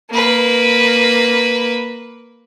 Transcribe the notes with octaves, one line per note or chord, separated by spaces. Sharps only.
A#3 B4